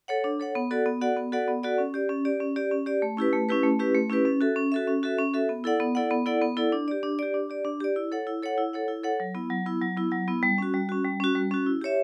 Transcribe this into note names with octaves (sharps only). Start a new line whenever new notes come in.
A4 C#5 F#5
D4
A4 C#5 F#5
B3
F#4 A4 D5 F#5
B3
F#4 A4 D5 F#5
B3
F#4 A4 D5 F#5
B3
F#4 A4 D5 F#5
C#4
G4 D5
C#4
G4 D5
C#4
G4 D5
C#4
G4 D5
A3
C#4 E4 G4 B4
A3
C#4 E4 G4 B4
A3
C#4 E4 G4 B4
A3
C#4 E4 G4 B4
C#4
F#4 A4 E5
C#4
F#4 A4 E5
C#4
F#4 A4 E5
C#4
F#4 A4 E5
B3
E4 A4 D5 F#5
B3
E4 A4 D5 F#5
B3
E4 A4 D5 F#5
B3
E4 A4 D5 F#5
D4
G4 D5
D4
G4 D5
D4
G4 D5
D4
G4 D5
E4
A4 C#5 F#5
E4
A4 C#5 F#5
E4
A4 C#5 F#5
E4
A4 C#5 F#5
F#3
B3 E4
F#3
B3 E4
F#3
B3 E4
F#3
B3 E4
G3
C#4 F#4
G3
C#4 F#4
G3
C#4 F#4
G3
C#4 F#4
E4
G4 C#5 E5